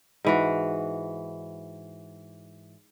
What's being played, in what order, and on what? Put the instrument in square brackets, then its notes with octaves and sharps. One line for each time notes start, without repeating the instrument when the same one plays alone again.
[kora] G#2 E3 F#4